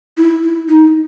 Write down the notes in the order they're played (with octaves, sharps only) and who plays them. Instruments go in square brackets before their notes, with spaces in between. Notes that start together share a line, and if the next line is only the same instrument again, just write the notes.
[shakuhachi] E4
E4
D#4